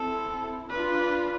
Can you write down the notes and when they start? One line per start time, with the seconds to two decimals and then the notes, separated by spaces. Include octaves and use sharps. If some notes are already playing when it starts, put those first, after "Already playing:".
Already playing: C4 E4 A4
0.70 D4 F4 B4